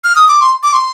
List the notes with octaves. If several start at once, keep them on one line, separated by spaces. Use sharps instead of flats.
F6
D#6
D6
C6
D6
C6